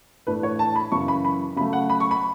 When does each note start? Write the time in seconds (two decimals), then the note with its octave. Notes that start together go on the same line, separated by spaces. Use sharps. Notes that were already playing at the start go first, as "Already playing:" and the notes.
0.27 A2 E3 A3 D4 B4
0.43 C#5
0.59 A5
0.76 B5
0.92 F#2 C#3 E3 C#6
1.08 B5
1.25 B5
1.56 C#3 F#3 A3 B5
1.73 F#5
1.90 B5
2.00 C#6
2.11 B5